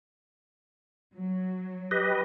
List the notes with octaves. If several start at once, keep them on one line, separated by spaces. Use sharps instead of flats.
F#3
G4 B4 D#5